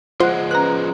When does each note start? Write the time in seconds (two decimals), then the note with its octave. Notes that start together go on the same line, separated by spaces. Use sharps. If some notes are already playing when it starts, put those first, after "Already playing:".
0.20 F3 G#3 F4 C5 F#5 F#6
0.51 C#4 B4 A#5 F#6